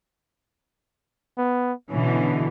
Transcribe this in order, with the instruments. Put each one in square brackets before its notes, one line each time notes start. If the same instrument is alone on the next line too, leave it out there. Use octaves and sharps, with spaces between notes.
[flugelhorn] B3
[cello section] B2 D3 E3 [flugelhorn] C#4